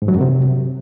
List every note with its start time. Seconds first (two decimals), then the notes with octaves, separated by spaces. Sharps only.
0.02 G#2
0.08 F#3
0.15 F#2
0.21 C3